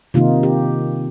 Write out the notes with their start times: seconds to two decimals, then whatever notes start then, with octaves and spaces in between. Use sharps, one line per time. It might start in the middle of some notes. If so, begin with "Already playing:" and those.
0.14 C3 D#3 A#3 D#4 F4
0.43 G4